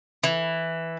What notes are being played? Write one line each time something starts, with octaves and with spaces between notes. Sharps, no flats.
E3